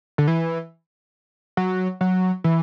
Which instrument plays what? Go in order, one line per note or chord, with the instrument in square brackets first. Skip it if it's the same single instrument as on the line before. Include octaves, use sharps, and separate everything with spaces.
[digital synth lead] D3
E3
F#3
F#3
E3